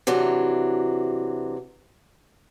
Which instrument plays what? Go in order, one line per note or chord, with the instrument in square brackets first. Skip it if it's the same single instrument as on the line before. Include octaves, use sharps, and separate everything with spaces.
[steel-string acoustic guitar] C3 E3 F#3 D4